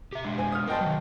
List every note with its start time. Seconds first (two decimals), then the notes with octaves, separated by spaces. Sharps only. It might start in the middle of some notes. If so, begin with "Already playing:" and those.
0.13 G4 E5
0.25 G#3 D4
0.38 C5 G#5
0.52 D#6 F6
0.68 A#4 C5 D#5 G5 A5
0.81 D#3 F#3